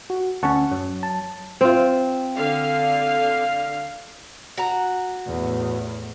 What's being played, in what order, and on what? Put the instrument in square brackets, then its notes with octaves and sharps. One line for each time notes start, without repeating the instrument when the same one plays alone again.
[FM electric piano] F#4
[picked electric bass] D2 C#4 [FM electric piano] F#5 A5 C#6
[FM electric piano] F#2 [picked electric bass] F#3
[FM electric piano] A5
[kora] C4 F4
[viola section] D3 F5
[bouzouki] F#4 A#5
[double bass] E2 A2